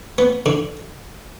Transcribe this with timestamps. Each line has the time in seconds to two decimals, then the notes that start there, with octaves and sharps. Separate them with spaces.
0.18 B3
0.46 D3